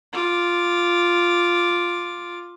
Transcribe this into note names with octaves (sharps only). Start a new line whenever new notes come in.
F4 D6